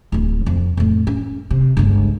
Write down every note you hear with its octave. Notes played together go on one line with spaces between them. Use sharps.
D1 E4
F2
F2 A2
C#4
C3
G1 C#2